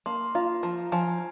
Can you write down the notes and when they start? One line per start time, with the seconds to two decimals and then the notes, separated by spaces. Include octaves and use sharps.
0.06 A#3 C6
0.35 F4 A#5
0.63 F3 A#5
0.92 F3 G#5